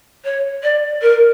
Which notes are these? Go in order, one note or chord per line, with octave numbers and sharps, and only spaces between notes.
C#5
D5
A#4